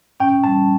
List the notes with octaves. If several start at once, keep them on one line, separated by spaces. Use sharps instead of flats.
C#4 G5
G3 A5